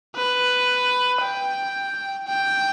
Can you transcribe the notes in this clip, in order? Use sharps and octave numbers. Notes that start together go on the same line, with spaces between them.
B4
G5
G5